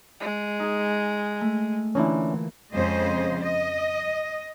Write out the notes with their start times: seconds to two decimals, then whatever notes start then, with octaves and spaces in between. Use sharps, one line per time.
0.21 G#3
0.59 D#4 G#4
1.41 A3
1.95 A#2 D3 E3 C#4 D4 E4
2.72 F2 C#3 G#3 C5 D#5
3.41 D#5